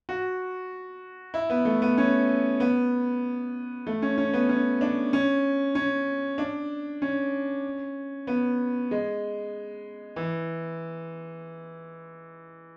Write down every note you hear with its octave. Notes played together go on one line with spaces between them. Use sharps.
F#4
E4
B3
A3
B3
C#4
B3
A3
C#4
C#4
B3
C#4
D4
C#4
C#4
D4
C#4
B3
G#3
E3